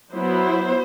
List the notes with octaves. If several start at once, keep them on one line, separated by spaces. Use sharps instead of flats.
F#3 B3 E4 C5